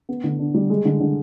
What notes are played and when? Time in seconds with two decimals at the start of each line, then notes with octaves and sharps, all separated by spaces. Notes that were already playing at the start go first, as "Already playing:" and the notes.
0.09 B3
0.24 D3
0.39 D4
0.54 G3
0.70 G#3
0.85 D3
1.00 D3